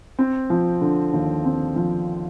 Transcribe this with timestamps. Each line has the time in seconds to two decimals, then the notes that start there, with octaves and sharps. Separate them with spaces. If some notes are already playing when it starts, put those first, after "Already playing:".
0.19 C4
0.50 F3
0.81 D3
1.13 D#2
1.45 C4
1.76 F3